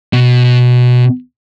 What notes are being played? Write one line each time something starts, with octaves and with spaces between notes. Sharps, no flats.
B2